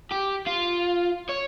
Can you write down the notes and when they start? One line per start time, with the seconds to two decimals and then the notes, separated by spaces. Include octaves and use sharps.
0.11 G4
0.47 F4
1.29 C#5